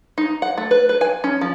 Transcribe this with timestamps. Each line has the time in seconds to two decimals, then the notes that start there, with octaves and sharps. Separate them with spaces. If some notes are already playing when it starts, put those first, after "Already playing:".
0.18 D#4
0.42 F#5
0.57 A3
0.71 B4
0.89 B4
1.01 G#5
1.24 C#4
1.41 F3